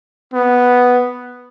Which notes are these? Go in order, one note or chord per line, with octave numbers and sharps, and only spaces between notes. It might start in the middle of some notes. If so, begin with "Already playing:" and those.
B3